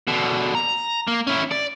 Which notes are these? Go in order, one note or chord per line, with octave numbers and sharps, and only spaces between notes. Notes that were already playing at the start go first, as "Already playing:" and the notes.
B2 D3
A#5
A#3
C#4 E4
D5